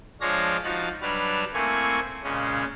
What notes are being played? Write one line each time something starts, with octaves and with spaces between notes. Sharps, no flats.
F3 G#3 D4 C#5 F5 A#6
F3 D#4 F#4 F#6 A6
F#3 G3 D4 B4 A5 F6
A3 A#3 C4 E4 G#5 C#6
A#2 C#3 G#3 C#4